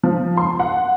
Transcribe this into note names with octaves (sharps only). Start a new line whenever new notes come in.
F3
C6
F#5